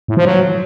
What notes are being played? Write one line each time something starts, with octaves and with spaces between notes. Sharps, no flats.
A2
F3
F#3